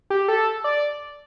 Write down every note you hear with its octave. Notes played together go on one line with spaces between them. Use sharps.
G4
A4
D5